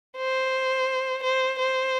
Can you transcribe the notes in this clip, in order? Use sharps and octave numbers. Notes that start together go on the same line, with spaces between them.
C5
C5
C5